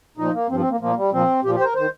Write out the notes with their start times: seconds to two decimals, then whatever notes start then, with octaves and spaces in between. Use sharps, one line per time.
0.17 A#2 F3 D#4
0.33 A#3
0.49 G2 F3 C4
0.60 C4
0.70 A#3
0.80 A#2 F3 A#3
0.96 G3
1.12 A#2 F3 C4
1.44 A#2 F3 G4
1.55 G4
1.60 C5
1.64 A#4
1.75 D#3 C5